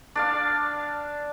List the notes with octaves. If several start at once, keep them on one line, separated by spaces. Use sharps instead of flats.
D4 D5 F5